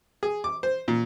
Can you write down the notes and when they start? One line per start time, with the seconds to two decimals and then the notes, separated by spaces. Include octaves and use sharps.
0.23 G#4
0.44 D6
0.63 C5
0.88 A#2